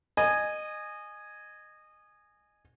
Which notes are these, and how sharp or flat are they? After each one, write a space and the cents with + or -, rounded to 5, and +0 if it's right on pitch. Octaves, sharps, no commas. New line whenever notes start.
D#5 -20 G#5 +0